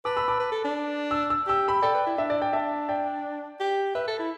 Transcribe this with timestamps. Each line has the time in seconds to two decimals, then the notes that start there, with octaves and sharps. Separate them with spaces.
0.05 B4 A5 D6
0.17 B5 E6
0.28 A5 D6
0.40 B4
0.52 A4
0.65 D4
1.11 E6
1.30 E6
1.47 G4 E6
1.68 B5 E6
1.82 A4 D5 G5
1.94 B4
2.07 E4
2.18 D4 E5
2.30 D5
2.41 D5 G5
2.53 D4 E5 A5
2.89 D5 G5
3.60 G4
3.95 B4 E5
4.08 A4
4.19 E4